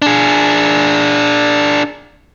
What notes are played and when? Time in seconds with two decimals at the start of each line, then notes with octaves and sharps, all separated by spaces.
0.02 D4 G#4